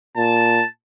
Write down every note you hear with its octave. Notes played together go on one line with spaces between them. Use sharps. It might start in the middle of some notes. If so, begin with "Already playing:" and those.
A#2 A5